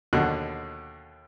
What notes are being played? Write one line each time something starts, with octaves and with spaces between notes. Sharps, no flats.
D#2 B2 D3 F#4 F#6